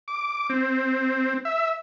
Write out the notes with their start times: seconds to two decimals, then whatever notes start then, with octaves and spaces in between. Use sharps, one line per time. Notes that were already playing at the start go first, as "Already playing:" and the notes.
0.08 D6
0.50 C4
1.45 E5